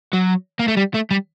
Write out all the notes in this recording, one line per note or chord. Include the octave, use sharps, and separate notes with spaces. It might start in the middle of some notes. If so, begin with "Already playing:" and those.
F#3
A#3
A3
G3
A3
G3